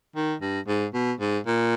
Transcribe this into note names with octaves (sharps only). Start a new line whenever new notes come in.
D#3
G2
G#2
B2
G#2
A#2